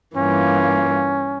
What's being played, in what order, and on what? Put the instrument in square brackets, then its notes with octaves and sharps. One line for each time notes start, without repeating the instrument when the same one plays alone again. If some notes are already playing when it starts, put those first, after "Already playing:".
[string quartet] G2 E3 A#3 F4 [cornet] C#4